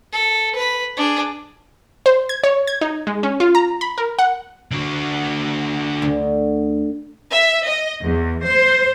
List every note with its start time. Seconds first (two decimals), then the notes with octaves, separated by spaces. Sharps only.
0.12 A4
0.55 B4 B5
0.97 D4 G#4
2.06 C5
2.29 G#6
2.44 C#5
2.67 G#6
2.81 D#4
3.07 G#3
3.23 C#4
3.40 F4
3.55 A#5
3.81 B5
3.98 A#4
4.19 F#5
4.71 D3 F#4
6.02 D2
7.33 E5
7.66 D#5
8.03 E2
8.44 C5